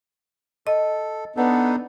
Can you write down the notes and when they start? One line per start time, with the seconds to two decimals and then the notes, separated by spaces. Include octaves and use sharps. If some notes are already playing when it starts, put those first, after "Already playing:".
0.67 A4 D#5
1.37 B3 D4 D#4 A4